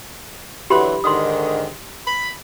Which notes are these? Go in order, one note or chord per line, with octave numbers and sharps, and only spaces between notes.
D3 E3 F#3 G4 B5 C6
G#2 D3 D#3 C6 D#6
B5